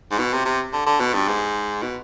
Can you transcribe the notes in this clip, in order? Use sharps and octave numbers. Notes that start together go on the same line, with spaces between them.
G#2
B2
C3
C3
D3
D3
B2
G2
G#2
B2